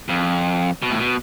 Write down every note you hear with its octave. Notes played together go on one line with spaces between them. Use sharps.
F2
B2
A2
B2